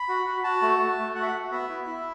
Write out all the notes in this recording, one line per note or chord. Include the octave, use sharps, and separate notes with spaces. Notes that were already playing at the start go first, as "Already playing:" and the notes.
Already playing: B5
F#4
F#4
F#4 A5
A3
A3
A3
F#4 F#5
E5
F#5
F#4
B3 E5
E4
E4